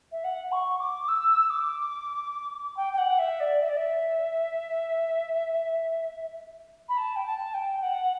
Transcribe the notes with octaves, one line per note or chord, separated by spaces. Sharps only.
E5
F#5
C#6
D6
E6
D6
G5
G5
F#5
E5
D5
E5
D5
E5
B5
A5
G5
A5
G5
F#5